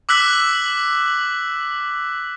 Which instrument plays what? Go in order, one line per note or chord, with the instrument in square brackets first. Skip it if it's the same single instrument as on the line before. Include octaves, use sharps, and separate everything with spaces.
[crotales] D6 E6 F#6 B6 F#7